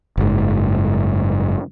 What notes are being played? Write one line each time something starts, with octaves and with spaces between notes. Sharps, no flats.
F#1 G#2